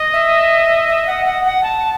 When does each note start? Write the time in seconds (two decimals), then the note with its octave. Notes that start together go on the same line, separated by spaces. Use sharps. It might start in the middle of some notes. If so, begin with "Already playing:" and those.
Already playing: D#5
0.13 E5
0.88 E5
1.07 F#5
1.26 F#5
1.45 F#5
1.63 A5